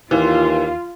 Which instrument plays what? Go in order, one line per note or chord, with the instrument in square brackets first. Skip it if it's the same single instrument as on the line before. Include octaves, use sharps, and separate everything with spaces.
[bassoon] D#2 [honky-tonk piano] E3 [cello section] F4